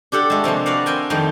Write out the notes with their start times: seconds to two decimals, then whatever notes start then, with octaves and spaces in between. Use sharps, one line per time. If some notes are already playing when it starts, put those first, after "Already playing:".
0.12 D4 G4 A4 F#5
0.30 G#3 A3
0.44 C3 F3 A#3 C4
0.66 F#4 B4 D5 F5 F#5
0.86 C4 A#4 G5 G#5
1.10 F2 D#3 G3 A3 G5